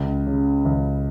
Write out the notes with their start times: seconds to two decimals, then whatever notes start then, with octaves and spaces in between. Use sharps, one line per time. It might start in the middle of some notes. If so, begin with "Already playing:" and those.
Already playing: C#2
0.27 C#3
0.65 C#2